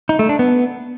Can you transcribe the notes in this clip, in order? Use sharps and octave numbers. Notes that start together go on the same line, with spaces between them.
D#4
A3
D4
B3